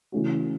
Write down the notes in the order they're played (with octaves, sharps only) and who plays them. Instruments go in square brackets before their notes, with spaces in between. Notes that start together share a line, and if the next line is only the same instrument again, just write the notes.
[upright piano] C#3 E3 A3 C#4 F#4